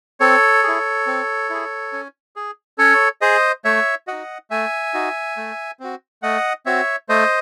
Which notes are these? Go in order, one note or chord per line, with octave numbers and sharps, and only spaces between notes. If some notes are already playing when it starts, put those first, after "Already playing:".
C4 A4 C#5
E4 G#4
C4
E4 G#4
C#4
G#4
C#4 A4 C#5
G#4 C5 D#5
A3 C#5 E5
D#4 F#4 D#5 F#5
A3 E5 G#5
D#4 F#4
A3
C4 F#4
A3 D#5 F#5
C4 F#4 C#5 E5
A3 C5 D#5